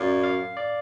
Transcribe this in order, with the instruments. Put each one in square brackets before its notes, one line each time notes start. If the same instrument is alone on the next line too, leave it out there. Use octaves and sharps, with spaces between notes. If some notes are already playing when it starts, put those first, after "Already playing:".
Already playing: [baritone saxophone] F#2 [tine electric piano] D5 F5
[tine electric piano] F5
D5